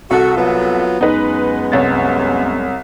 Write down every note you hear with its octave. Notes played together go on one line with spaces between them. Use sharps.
C2 F#4 A4
F#3 B3 F4
F#2 G#3 B3 D#4 B4
C2 C#5 A6